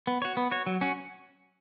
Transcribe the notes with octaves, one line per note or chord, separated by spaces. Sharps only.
B3
F#4 C#5
B3
F#4 C#5
F#3
C#4 F#4